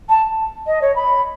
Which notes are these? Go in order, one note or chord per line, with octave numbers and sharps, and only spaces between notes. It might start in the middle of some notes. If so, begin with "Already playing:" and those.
A5
D#5
C#5
B5